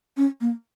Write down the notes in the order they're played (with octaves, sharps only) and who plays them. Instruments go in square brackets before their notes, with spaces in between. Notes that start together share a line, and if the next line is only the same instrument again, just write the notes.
[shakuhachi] C#4
A#3